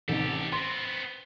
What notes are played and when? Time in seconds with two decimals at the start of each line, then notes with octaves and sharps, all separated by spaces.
0.08 A1 C3 D#3 G4 A4
0.52 B3 C4 C6